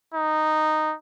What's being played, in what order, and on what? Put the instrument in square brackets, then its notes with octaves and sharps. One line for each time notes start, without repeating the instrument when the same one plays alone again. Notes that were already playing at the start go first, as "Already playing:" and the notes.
[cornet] D#4